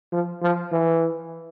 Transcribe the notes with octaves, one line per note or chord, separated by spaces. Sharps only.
F3
F3
E3